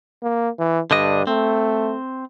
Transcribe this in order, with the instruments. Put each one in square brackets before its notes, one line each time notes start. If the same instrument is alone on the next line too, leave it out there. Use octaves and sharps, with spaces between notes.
[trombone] A#3
E3
[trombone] G2 [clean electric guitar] D3 D4 D#5
[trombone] A3 [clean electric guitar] C4